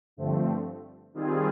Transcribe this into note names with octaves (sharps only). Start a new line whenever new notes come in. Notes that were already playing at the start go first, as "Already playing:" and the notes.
G2 D3 F3 A3 C4
D#3 G3 C4 F4 G#4